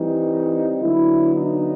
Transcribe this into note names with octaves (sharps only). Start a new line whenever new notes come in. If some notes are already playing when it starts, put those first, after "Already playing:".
Already playing: E3 G3 C4 D#4
D3 F#3 B3 E4
D#4